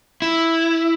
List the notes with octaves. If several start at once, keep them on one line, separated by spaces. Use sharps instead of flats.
E4